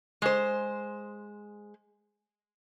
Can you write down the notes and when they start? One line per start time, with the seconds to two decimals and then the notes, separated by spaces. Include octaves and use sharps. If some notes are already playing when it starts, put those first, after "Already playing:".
0.22 G#3 C5